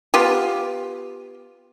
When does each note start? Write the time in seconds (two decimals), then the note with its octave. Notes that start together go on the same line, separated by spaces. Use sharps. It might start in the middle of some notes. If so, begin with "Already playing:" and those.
0.14 B3 F4 G4